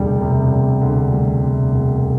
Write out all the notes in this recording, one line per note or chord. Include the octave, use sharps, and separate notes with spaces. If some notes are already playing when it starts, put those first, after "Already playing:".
Already playing: E1 D2 C3 G3
C3
E1
D2
G3
C3
E1